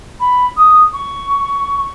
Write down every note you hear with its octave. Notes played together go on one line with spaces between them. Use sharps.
B5
D#6
C#6